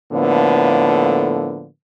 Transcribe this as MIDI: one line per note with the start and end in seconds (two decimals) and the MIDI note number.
0.13 1.67 45
0.13 1.67 50
0.13 1.67 53
0.13 1.67 58
0.13 1.67 59